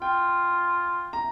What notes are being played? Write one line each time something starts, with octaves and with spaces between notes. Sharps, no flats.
F4 G5
A#5